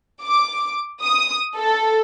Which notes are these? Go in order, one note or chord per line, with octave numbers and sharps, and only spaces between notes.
D6
D#6
A4